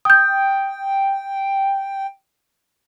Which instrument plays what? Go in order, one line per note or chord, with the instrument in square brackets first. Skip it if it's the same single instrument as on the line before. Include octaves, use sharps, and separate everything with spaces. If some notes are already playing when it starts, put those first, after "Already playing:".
[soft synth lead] G5 [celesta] D#6 G6